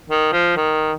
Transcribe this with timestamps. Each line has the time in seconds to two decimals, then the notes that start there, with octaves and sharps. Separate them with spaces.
0.09 D#3
0.32 F3
0.56 D#3